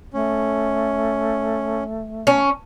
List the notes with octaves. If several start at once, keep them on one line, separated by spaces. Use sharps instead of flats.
A3 C#4
C#4